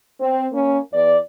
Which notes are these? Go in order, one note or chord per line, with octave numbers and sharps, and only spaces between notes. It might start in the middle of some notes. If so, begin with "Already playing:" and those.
C4
A#3 C#4
E2 D5